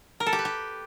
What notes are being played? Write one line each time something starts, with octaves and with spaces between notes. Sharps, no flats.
A#4
A4
G4
B4
G4